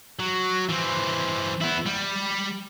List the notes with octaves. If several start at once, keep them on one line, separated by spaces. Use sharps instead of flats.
F#3
E3 C4
B3 E4
G3